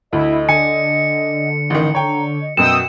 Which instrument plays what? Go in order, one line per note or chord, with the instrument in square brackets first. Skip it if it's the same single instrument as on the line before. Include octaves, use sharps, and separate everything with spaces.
[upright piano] D2 [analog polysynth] E4 [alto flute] D#5
[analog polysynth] D3 [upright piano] G#5 [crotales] C#7
[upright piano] A1 D#3
[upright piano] C#5 G5 [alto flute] A#5
[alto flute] D#5
[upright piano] F#2 B2 [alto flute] F#4 [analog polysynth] G5 D#6 E6 [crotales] E7